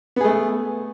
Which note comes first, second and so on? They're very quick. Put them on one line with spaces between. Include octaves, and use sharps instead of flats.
B3 G#4 A3